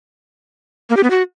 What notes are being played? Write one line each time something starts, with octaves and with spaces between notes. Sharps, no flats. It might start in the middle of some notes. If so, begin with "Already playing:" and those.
A#3
G4
B3
F#4